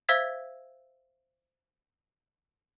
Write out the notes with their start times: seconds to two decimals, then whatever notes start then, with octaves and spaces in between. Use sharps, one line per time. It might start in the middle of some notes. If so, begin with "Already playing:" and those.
0.09 C5 E5 F5 E6 G#6 B6